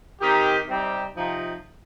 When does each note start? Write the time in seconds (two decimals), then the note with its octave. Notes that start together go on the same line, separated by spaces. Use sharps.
0.21 D#3 C4 D#4 G4
0.67 C3 G3 C4 D#4 G4
1.15 C3 F3 D#4